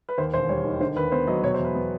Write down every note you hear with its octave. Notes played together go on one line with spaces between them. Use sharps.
B4
D#2 C5
E1 C5
G3 C#5
D#3
D3 C5
D#2 B4
B3 C5
F#3 D#5
B2 C#5
C5
E2
B4
B3